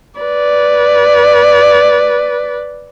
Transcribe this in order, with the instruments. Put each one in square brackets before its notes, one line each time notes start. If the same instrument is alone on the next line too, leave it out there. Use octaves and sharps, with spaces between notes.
[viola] B4 D5